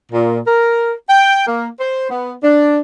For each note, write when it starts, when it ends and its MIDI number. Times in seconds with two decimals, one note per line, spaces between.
0.12 0.39 46
0.47 0.93 70
1.09 1.45 79
1.47 1.68 58
1.80 2.07 72
2.10 2.32 59
2.44 2.79 62